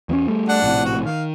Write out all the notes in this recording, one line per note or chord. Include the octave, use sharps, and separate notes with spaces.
E2 B3 C#4
G3 A3
D4 F#5
A#1 A2 C3
F#4
D#3 F5